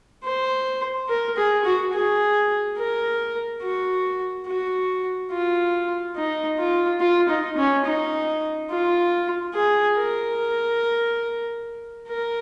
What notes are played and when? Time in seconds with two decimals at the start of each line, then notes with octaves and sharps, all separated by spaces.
0.24 C5
1.09 A#4
1.37 G#4
1.65 F#4
1.93 G#4
2.78 A#4
3.62 F#4
4.46 F#4
5.31 F4
6.16 D#4
6.58 F4
7.00 F4
7.29 D#4
7.57 C#4
7.85 D#4
8.70 F4
9.54 G#4
9.97 A#4
12.08 A#4